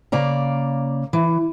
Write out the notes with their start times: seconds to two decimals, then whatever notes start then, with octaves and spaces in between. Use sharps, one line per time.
0.12 C#3 A#3 D5 A#5
1.13 E3